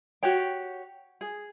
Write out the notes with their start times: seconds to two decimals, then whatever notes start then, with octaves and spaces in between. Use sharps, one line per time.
0.23 F#4 G4 C#5 G5
1.21 G#4